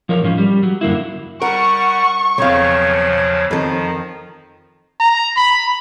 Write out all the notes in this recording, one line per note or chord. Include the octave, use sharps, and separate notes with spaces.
F3 A#4 C#5
G#2 F3 C#4
G3
F#3
F#2 D3 A#3 E4
G3 A#4 F#5 C#6
B1 E2 C#3 F3 C4 C#5 F5
F2 D#3 F3 A4
A#5
B5